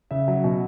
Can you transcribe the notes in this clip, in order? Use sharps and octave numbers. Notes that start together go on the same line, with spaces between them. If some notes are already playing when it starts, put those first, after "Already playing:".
C#3 E5
F#3
B2